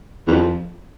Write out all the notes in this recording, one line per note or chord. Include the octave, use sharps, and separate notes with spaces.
E2
F2